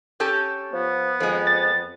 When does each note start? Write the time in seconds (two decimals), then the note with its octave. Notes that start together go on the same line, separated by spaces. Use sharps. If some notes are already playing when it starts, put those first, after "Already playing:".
0.20 C#4 G4 A4
0.73 F3 B3
1.20 F2 F3 G#3
1.47 A6